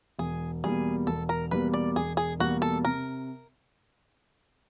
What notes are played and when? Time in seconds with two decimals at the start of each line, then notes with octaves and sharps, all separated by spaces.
0.19 E1 G#4
0.64 E2 B2 G3 A#3 G#4
1.07 E1 A4
1.29 A#4
1.51 E2 B2 G3 A#3 B4
1.74 D5
1.96 E1 G#4
2.17 G#4
2.39 E2 B2 G3 A#3 F#4
2.62 A4
2.84 C3 A#4